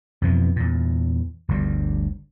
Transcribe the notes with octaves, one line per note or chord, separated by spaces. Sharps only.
F2 B2 E3
E2 A#2
G1 D2 G3